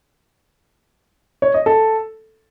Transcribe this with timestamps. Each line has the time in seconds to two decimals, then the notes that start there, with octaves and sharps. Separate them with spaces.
1.42 C#5
1.54 D#5
1.66 A4